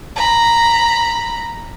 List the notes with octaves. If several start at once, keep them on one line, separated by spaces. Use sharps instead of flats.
A#5 B5